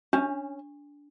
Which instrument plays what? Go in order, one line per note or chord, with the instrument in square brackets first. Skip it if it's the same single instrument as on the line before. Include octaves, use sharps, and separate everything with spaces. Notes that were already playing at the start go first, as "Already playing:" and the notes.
[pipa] C#4 [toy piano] D4